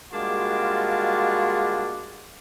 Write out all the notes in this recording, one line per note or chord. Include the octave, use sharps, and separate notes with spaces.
G3 G#3 A#3 D4 F4 F#4